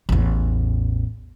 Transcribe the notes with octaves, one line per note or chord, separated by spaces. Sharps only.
A1 E2